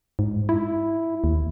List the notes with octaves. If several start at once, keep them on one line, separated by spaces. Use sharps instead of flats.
G#2
E4
D#2